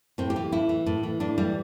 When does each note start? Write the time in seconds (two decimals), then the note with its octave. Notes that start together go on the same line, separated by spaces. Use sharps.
0.18 A2 C4
0.30 G4
0.36 E3
0.52 A2 E4
0.69 E3
0.86 A2
1.03 E3
1.20 A2 D4
1.38 E3 G3